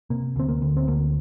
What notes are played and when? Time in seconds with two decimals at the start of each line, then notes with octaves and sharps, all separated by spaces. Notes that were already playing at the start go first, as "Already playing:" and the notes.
0.10 C3 A#3
0.36 D2 C4
0.49 A#3
0.62 D2
0.77 C4
0.88 D2 A#3